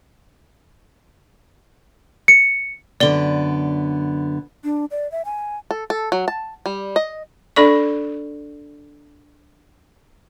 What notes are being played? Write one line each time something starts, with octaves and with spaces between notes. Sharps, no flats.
C#7
F#2 D3 B3 D5 G7
D4
D5
E5
G#5
A4
A4
F#3
A5
G3
D#5
D4 A4 D5 C#6